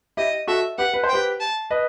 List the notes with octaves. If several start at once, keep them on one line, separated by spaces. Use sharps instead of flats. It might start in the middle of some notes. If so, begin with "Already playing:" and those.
E4 G4 D#5
F#4 A4 E5
G4 B4 F#5
B4
C5
G4 B4 G5
A5
B4 D#5